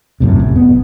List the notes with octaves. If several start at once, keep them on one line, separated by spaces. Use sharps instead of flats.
D1 F#2 A2 C3
F1
B3